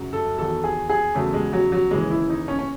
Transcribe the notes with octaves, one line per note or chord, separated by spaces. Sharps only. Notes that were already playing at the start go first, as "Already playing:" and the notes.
Already playing: F#2 C#3 F#3
A4
E2 D#3 F#3 A4
G#4
G#4
E2 C#3 F#3 A3
G#3
F#3
F#3
D#2 C#3 E3 G#3
E4
D#4
C#4
C#4